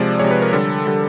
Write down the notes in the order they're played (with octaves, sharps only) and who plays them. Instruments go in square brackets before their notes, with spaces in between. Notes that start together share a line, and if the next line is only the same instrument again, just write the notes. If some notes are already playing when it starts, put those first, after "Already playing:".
Already playing: [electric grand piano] C3 F3 G#3 D5
C3 F3 G#3 C#5
B4
A#4
D3 G3 A4
D3 G3